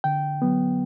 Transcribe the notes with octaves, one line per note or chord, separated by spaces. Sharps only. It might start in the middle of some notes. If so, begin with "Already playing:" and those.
D3 G5
F#3 B3